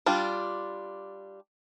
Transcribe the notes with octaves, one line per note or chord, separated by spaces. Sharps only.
G3 D4 F4